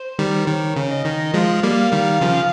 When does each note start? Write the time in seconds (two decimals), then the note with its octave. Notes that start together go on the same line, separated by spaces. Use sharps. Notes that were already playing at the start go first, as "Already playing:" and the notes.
Already playing: C5
0.19 D#3 G3
0.47 D#3 C#5
0.76 C#3
0.90 D#5
1.05 D#3
1.34 F3 G#3 F5
1.63 G3 A#3
1.92 D#3 G3
2.21 C#3 F3